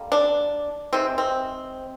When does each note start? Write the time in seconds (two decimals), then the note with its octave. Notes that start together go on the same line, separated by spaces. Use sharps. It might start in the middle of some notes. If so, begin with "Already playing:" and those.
Already playing: D3 G3 A#3
0.12 D4
0.93 C3 D#3 G#3 C4
1.18 C4